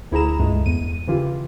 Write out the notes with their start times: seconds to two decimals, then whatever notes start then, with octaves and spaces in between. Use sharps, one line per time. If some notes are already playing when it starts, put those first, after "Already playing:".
0.11 D2 E4 G#4 A#5 E7
0.39 C#2 G2 G#3 A3
0.66 E2 D#7
1.08 C#3 E3 F4 G4